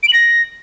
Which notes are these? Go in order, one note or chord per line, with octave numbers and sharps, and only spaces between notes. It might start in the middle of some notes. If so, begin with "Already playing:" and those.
D7
F#7
A#6